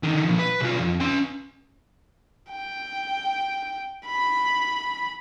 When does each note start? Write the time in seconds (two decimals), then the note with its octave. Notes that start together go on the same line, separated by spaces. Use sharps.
0.03 D3 D#3
0.25 A#2 F3
0.39 B4
0.61 B1 F4
0.79 F2
1.01 C#4 C6
2.52 G5
4.07 B5